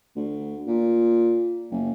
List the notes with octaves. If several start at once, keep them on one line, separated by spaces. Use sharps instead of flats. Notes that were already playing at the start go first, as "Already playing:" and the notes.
D2
A#2
F#1